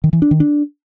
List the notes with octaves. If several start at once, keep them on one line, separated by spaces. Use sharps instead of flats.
D#3
E3
D4
D#3
D4